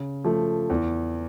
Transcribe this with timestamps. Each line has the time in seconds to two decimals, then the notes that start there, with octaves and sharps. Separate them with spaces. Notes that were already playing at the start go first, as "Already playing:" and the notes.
Already playing: C#3
0.25 F3 A3
0.70 E2